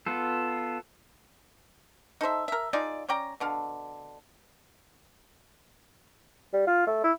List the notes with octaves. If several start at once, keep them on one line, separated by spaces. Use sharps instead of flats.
B3 F4 A4
D#4 A4 C5 E5
A#4 E5
D#4 F4 G#4 D5
C#4 D5 G5 A#5
B2 D3 F5
G3
F4
A3
E4